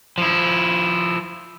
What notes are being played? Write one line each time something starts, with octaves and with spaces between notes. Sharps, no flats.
F3 E4